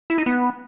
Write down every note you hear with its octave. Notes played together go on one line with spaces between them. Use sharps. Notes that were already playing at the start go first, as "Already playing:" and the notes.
E4
D#4
B3